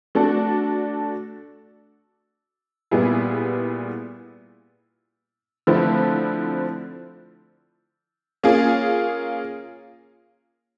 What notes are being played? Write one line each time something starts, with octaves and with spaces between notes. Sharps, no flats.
A3 D4 F#4 A4
A#2 G3 B3 E4 G#4
D3 F3 A3 C4 E4
A#3 C#4 F4 G#4